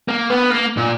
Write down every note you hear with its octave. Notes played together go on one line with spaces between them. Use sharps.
A#3
B3
A#3
A#2